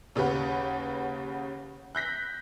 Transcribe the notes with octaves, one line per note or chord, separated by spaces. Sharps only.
D#2 C#3 G4 B4 F#5
F#6 G6 A#6 B6